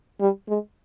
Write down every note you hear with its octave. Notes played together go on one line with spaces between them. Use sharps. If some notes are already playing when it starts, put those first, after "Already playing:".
G3
G#3